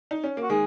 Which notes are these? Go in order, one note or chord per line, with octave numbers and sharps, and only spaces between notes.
D#4
C#4
A#3
F#4
D#3 G#3 G#4